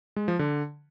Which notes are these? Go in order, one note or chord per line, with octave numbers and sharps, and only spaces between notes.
G#3
F3
D3